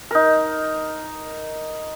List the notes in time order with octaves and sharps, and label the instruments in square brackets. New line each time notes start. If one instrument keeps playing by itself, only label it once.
[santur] D#4 A#4